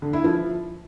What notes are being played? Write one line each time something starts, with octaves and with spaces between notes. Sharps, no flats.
D3
E4
F3